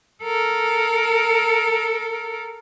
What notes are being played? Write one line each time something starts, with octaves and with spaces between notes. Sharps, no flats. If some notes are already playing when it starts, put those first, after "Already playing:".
A4 A#4